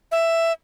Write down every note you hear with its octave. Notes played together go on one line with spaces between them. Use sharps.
E5